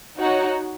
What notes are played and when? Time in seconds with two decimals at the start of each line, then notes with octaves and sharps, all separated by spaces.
0.19 D#4 F#4 C#5 F#5